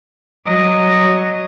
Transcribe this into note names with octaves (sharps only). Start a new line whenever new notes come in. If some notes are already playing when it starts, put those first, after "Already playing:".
F#3 D#5